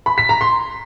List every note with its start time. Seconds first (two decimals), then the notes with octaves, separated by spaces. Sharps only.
0.06 B5
0.18 B6
0.29 A#5
0.41 C6